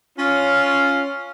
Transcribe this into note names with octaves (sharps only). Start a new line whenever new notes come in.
C#4 F4